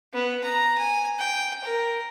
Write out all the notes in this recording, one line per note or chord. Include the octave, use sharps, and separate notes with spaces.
B3
A#5
G#5
G5
A#4